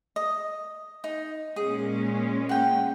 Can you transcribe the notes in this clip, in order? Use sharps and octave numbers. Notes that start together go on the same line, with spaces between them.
D#5
D#4
A#2 G#3 C#4 G#4
F#5 G5